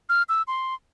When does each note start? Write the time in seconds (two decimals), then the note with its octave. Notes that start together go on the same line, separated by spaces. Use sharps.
0.09 F6
0.29 E6
0.48 C6